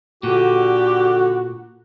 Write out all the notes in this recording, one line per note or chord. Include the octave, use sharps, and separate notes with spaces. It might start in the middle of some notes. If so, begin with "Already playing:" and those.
A#2 D3 F#4 G4